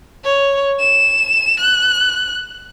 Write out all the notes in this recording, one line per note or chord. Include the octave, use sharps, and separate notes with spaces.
C#5
E7
F#6